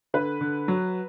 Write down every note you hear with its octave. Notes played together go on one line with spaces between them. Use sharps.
D3 B4
D3
F#3